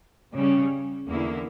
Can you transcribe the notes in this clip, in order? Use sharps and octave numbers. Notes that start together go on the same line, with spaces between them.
C#3 G3 C#4
E2 D3 A#3 E4